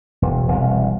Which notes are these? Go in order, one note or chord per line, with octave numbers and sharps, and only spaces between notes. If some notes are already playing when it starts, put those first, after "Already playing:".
E1
E1 C2